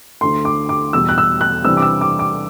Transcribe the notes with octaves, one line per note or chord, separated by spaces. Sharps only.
D2 D3 A3 C6
D6
D6
E2 B2 G3 E6
F#6
E6
F#6
C3 E3 G3 D4 E6
D6
E6
D6
D6